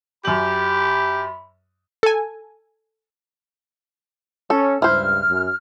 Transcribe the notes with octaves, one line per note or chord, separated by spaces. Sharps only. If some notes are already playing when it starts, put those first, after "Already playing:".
F#2 G4 B5 F#7
A4 G#5
C#4 A4
C#2 G2 E4 C5 F6
F#2